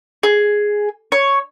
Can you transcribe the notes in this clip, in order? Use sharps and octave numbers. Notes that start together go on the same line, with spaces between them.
G#4
C#5